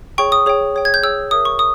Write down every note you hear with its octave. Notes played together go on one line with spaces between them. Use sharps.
G#4 C#5 G5 C#6
D#6
G#4 C#5 G5
G#4 C#5 G5
G#6
G6
G#4 C#5 G5 E6
A#4 C#5 E5 D#6
C#6
D#6